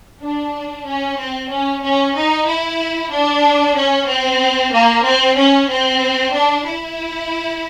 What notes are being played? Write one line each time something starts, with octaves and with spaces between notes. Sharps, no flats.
D4
C#4
C4
C#4
C#4
D#4
E4
D4
C#4
C4
A#3
C4
C#4
C4
D4
E4